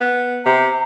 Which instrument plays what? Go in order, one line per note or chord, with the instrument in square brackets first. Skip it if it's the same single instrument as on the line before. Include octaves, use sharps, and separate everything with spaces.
[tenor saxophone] B3
[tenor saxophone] C3 [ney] A#5